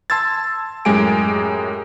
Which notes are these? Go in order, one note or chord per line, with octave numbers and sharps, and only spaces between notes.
A5 C6 E6 G#6 A6
F#2 A2 G#3 G4 G#5 D7